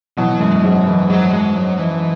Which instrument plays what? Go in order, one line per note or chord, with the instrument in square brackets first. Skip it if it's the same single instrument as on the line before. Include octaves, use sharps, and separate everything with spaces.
[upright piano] B2 E3 [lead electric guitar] F#3
[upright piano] F#2 [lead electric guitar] G#3
[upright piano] G#2 [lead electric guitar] F#3
[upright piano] F#2 [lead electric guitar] E3
[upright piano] G#2 [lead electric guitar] F#3
[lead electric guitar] G#3
F#3
E3